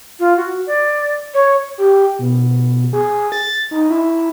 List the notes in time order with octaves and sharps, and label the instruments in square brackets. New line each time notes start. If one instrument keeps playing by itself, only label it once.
[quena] F4
F#4
D5
C#5
[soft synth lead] G4
B2
G#4
A6
D#4
E4